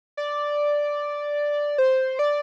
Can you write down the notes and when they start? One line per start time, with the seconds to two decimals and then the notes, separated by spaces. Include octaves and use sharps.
0.17 D5
1.78 C5
2.19 D5